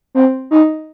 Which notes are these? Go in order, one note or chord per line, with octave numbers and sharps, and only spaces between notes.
C4
D#4